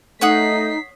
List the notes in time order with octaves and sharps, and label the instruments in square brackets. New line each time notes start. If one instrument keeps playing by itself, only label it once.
[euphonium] A3 [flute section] D#4 [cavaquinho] C#5 F#5 D#6 [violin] B6 C7